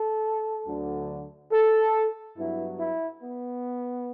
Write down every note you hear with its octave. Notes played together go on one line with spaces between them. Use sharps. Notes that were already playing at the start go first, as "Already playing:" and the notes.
Already playing: A4
D2 D3 F#3
A4
G2 F#3 B3 E4
E4
B3